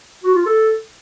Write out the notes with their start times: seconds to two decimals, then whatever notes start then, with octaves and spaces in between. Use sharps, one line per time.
0.24 F#4
0.35 F4
0.46 A4